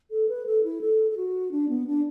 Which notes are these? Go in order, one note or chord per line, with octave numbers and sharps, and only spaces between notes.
A4
B4
A4
E4
A4
A4
F#4
D4
B3
D4